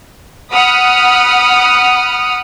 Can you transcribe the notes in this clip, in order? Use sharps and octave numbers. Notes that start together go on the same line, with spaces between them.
F#5 B5 D#6 F6